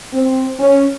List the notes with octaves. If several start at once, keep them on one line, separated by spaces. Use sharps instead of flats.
C4
C#4